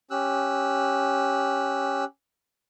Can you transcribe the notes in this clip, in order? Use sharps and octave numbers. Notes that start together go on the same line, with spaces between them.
C#4 G4 E6 F#6